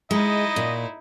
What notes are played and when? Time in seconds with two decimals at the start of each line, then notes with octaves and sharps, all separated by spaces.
0.11 G#3 D#4 E4 D#5
0.56 A#2